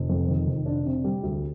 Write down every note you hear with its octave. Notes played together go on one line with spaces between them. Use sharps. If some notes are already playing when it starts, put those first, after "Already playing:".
Already playing: F1
F2
D#3
F1
D4
C3
G3
D2